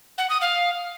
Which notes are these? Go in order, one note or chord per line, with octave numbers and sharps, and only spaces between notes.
F#5
D#6
F5